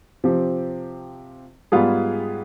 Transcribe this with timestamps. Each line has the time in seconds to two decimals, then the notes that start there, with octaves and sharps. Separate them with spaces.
0.24 C3 F3 C4 G4
1.72 G#2 G3 B3 F4 G#4